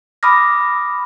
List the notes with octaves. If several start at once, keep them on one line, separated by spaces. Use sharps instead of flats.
B5 D6 D#6 F6 A#6